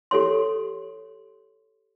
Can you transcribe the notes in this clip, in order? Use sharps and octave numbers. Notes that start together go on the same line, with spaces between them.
G4 A4 C#5 C6